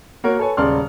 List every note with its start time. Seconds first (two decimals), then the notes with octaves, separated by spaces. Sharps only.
0.24 A#3 F#4 A#4 C#5
0.39 A4 B4 C#5 G#5
0.57 D#1 C#3 G#3 D5 C6 F6